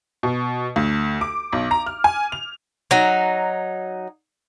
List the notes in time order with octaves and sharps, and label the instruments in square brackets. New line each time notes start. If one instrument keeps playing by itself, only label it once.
[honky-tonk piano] B2
D2
D6
B1
A#5
F6
G#5
F7
[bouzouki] F#3 D#4